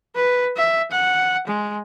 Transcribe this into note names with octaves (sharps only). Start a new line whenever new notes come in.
B4
E5
F#5
G#3